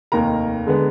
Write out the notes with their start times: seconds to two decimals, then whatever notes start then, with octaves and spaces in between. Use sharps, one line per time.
0.12 F1 D#2 D#3 A#3 A#4 A#5
0.67 D3 G#3 B3